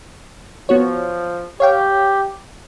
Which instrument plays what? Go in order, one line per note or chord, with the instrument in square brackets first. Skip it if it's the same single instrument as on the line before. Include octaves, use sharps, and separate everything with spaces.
[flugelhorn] F3 [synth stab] B3 F#4 C#5
[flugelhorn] G4 [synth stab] C#5 F5 G5